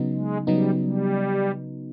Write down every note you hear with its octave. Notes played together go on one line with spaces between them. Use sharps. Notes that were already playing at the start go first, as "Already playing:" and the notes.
Already playing: C#3 F#3 B3 D#4
G#3
C#3 F#3 G3 B3 D#4
G3